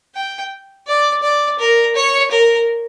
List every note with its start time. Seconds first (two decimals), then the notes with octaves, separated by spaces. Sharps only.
0.15 G5
0.87 D5
1.23 D5
1.59 A#4
1.96 C#5
2.31 A#4